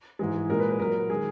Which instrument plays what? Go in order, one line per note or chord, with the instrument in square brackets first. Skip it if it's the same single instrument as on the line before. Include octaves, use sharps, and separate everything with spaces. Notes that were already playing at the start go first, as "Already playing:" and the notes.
[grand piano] G#2 E3 G#3
A#2 G#3 A#4
B4
B4
A#2 F#3 A#4
D#3 G#3 G#4